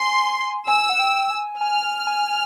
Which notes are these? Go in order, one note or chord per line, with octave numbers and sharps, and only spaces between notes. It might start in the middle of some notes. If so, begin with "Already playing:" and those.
Already playing: G#5 C6
G#5 E6
F#5
G5
G#5
G#5 F6
G#5